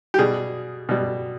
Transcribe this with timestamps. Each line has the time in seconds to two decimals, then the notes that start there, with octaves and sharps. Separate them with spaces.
0.14 G4
0.19 B2 G3 G#4
0.89 B2 G3